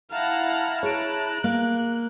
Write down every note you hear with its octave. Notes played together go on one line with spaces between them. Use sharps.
E4 F5 F#5 A5 A#5
G#4 C#5 F#6 D7
A#3